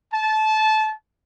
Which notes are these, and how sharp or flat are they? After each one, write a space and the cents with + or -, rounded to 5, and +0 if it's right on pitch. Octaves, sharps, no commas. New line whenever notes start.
A5 -20